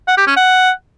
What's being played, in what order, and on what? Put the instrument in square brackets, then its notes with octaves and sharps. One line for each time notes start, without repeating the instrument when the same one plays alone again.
[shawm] F#5
G4
C#4
F#5